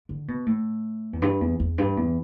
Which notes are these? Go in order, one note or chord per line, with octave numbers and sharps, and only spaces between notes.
D3
B2
A2
E2
G2
E2
E2
G2
E2